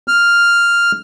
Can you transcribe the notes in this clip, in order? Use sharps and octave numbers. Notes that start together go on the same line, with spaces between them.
F6